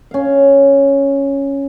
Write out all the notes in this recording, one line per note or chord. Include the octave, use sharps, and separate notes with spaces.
C#4 F5